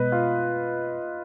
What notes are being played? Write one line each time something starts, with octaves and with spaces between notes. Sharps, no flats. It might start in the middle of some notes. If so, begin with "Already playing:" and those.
Already playing: B2 G#3 B3 B4 D#5
F4